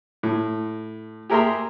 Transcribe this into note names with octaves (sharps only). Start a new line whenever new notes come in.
A2
G4 G#4 A#4 E5 A#5 C6